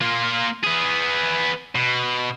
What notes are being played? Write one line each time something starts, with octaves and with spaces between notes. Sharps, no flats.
A#3 F4
B3 G#4
B2